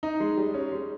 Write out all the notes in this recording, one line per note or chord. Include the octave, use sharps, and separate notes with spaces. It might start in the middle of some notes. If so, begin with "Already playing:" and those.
D#4
G#3
G3
C#4
G#3